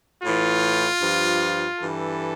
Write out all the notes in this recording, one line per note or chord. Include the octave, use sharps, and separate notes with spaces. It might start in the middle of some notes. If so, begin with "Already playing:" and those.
A2 E3 F4
G2 F3
G2 E3 A4